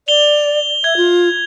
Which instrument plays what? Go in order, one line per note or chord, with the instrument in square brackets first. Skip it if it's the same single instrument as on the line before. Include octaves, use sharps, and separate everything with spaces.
[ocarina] D5 [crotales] F7 G7
[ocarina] E5 [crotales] G#6
[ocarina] F4